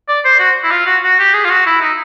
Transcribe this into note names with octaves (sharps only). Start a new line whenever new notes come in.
D5
C5
F#4
E4
F4
F#4
F#4
G4
G#4
F4
F#4
E4
D#4